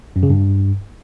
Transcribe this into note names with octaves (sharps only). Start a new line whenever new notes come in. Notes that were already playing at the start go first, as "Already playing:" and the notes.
F#2
C#3
G2